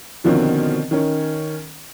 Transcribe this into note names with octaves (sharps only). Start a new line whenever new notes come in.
B2 D3 D#3 F3 C4 C#4
D#3 C#4